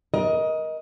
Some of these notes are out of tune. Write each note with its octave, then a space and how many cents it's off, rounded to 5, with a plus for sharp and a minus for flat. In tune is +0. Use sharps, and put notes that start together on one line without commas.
A#4 +30 D#5 +15